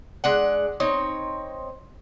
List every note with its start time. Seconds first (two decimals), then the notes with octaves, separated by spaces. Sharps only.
0.24 G#3 D4 F#5
0.80 C4 D#4 C#5